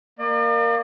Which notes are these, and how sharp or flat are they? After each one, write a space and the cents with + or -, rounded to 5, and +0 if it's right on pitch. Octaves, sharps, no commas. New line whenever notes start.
A#3 +0 D5 +45